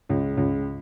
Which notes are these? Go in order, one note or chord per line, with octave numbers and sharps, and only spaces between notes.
C#2
C#2